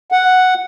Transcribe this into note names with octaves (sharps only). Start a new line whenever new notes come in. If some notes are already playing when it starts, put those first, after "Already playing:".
F#5